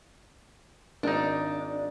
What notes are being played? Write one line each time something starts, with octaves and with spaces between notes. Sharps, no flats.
G#1 D4 D#4